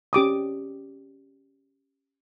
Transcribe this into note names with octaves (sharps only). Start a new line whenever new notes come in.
C#4 G4 D6 D#6